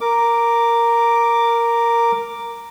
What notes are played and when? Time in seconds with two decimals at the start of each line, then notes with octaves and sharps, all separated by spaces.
0.01 A#4 D6